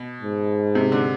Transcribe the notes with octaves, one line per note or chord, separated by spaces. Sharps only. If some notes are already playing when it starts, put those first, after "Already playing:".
Already playing: B2
G#2
C3
D3